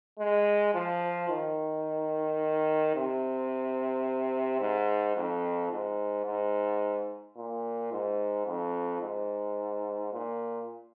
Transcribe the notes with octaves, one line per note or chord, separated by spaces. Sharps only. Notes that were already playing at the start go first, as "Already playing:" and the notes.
G#3
F3
D#3
C3
G#2
F2
G#2
G#2
A#2
G#2
F2
G#2
A#2